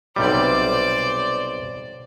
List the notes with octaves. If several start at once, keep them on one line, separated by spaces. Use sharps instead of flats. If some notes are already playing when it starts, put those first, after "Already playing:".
B1 C3 G3 C5 D5 D6